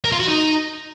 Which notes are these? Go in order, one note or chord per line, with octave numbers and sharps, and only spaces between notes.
A#4
F4
F#4
D#4